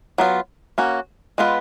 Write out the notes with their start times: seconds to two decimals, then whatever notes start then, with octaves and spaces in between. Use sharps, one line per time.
0.18 F#3 B3 F4
0.78 A#3 C#4 F#4
1.38 G#3 B3 F4 B4